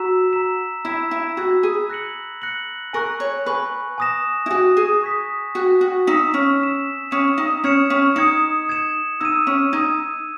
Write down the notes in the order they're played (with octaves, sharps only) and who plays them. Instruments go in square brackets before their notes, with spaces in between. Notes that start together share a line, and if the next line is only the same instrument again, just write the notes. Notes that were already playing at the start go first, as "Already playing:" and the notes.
Already playing: [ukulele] F#4 [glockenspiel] A#5 E6 B6 E7
[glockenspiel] A#5 E6 B6 E7
[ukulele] E4 [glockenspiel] B5 E6 G#6 B6
[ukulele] E4
[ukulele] F#4 [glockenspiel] B5 E6 G#6 B6
[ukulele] G#4
[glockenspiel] F#6 A#6 C#7 F#7
F#6 A#6 C#7 F#7
[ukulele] A#4 [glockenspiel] G#5 C#6 F#6
[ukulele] C#5
[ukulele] B4 [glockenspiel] G#5 C#6 F#6
[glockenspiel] G#5 D#6 A#6 E7
[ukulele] E4
[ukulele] F#4 [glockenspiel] G#5 D#6 A#6 E7
[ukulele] G#4
[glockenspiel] C#6 G#6 B6
[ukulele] F#4 [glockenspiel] C#6 G#6 B6
[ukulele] F#4
[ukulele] D#4 [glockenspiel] E6 B6 E7
[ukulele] C#4
[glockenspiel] E6 B6 E7
[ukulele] C#4 [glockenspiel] D#6 G#6 C#7 E7
[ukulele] D#4
[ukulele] C#4 [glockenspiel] D#6 G#6 C#7 E7
[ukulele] C#4
[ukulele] D#4 [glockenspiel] D#6 G#6 C#7 E7
[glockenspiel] D#6 G#6 C#7 E7
[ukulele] D#4 [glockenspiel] E6 G#6 D#7
[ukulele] C#4
[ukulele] D#4 [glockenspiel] E6 G#6 D#7